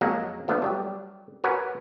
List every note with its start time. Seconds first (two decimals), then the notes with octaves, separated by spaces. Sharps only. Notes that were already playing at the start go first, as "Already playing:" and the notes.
0.01 F2 F#3 G#3 A#3 F#5 A#5
0.48 F3 A3 B3 D4 D5
0.62 F#3 G3 G4
1.44 F#4 A#4 B4 C#5 F#5 G#5